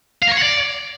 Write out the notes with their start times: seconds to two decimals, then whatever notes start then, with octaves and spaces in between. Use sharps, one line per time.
0.22 F5
0.27 A#4
0.32 C#5
0.37 F#5
0.42 D5